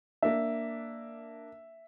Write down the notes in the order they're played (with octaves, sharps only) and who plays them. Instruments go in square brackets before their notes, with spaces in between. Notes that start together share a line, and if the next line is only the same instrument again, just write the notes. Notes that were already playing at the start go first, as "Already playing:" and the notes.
[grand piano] A#3 D4 [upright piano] E5